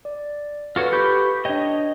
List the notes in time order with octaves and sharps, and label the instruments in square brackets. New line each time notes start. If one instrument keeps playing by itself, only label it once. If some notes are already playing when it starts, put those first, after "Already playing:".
[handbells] D5
[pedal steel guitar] F4 F#4 C#5 [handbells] A4 B4
[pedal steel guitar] G4 G6 [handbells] B4 B5 C#6
[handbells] D4 G5 [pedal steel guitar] C#5 D#5